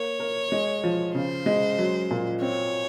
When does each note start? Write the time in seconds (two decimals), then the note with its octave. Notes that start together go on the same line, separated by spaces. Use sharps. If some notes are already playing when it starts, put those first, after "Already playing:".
Already playing: A#3 C#5
0.20 A#4
0.52 G#3
0.84 F3
1.15 C#3 C5
1.46 G#3
1.78 F#3
2.10 A#2
2.42 C4 C#5